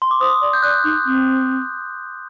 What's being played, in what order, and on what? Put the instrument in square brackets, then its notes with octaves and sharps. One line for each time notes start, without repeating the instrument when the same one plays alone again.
[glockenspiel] C6
D6
[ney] C5 [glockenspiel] D#6
[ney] D5
[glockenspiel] G6
[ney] D5 [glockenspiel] F#6
[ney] D#4
C4